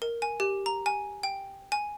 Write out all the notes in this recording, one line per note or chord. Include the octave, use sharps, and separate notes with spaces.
A#4
G#5
G4
A#5
G#5
G5
G#5